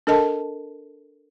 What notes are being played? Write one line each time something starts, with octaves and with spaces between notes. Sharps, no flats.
D4 A4 A#4 D#5 A5